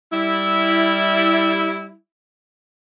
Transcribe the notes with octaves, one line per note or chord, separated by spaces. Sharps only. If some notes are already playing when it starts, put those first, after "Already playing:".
G3 E4